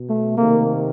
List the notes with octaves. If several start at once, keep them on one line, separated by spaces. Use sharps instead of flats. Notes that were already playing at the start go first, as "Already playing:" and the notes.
Already playing: B2
A3
C3 D#3 A#3